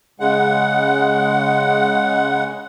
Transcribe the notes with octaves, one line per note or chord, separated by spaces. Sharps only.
C#3 G#3 F#5